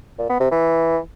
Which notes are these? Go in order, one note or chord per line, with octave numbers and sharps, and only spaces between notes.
A#2
B3
C3
E3